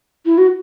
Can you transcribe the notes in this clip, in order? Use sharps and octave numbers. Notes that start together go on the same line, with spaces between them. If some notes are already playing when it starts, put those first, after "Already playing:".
E4
F#4